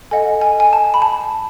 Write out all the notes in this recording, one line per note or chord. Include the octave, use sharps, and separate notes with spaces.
A4 D#5 F#5 G#5
G#5
G#5
A5
B5
A5